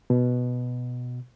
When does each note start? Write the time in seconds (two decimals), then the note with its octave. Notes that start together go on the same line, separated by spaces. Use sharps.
0.10 B2